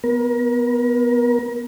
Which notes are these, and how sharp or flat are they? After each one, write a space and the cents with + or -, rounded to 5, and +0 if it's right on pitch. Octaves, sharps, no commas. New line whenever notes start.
B3 +0 A#4 +35